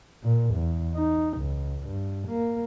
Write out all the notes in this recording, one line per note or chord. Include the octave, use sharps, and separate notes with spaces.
A#2
E2
D#4
C#2
G2
A#3